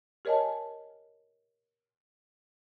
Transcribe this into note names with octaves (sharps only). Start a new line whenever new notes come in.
G4 A#4 C#5 D#5 G#5 A5